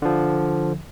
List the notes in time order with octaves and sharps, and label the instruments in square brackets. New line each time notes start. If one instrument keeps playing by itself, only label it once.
[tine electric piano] D3 F3